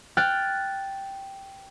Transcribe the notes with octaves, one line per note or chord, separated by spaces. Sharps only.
G5 F6 F#6 A6